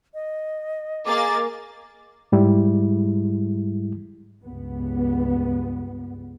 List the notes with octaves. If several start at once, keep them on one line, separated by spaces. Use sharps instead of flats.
D#5
A#3 G#4 D6 A6
G#2 G3 G#3 E4
C#2 G2 B3